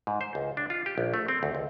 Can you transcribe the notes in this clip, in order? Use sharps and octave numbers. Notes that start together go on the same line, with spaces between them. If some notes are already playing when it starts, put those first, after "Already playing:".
G#2
C5
C#2
D4
F4
G4
A#1
A3
C4
D2
C#2